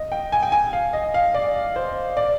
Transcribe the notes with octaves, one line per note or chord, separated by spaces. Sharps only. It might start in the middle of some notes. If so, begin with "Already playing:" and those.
Already playing: D#5
G5
G#5
G5
G#5
F5
D#5
F5
D5
C5
D5